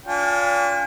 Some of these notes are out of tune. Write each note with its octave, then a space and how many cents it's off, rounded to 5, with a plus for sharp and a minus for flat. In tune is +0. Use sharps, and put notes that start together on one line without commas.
D4 -40 F4 +20 G#5 -45